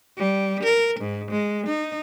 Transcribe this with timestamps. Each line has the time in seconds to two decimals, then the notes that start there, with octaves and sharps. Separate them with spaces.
0.18 G3
0.63 A#4
1.00 G#2
1.31 G#3
1.67 D#4